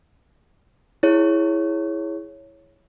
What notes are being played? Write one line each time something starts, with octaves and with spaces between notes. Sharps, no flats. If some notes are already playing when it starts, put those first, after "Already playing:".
E4 G#4 C#5